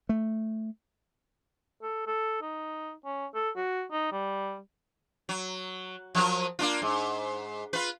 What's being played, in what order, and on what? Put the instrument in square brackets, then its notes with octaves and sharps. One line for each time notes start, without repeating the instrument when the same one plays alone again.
[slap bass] A3
[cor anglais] A4
A4
D#4
C#4
A4
F#4
D#4
G3
[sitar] F#3
F3 F#3 A#4
A#3 D4 F4
G#2
F4 B4